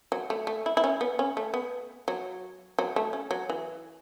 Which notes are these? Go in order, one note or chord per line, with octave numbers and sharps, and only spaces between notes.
F#3
A3
A3
E4
E4
C#4
B3
C#4
A3
B3
F#3
F#3
A3
C#4
F#3
E3